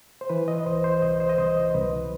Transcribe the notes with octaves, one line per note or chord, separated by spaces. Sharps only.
C5
E3 B4
D#5
C2 C5
C5
C2 D#5
C5
D#5
C2 C5
D#5
C2 B4